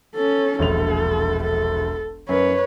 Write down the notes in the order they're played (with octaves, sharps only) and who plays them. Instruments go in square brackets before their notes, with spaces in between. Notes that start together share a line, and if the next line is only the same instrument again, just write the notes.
[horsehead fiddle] C#4 A4
[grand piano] E1 A#1 F7 [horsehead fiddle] A4
[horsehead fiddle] A4
[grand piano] F#2 [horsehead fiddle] B4 C#5